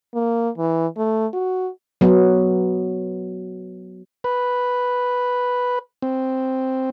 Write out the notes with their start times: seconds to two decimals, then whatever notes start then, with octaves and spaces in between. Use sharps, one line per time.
0.14 A#3
0.58 E3
0.97 A3
1.34 F#4
2.01 F#3 B3
4.24 B4
6.02 C4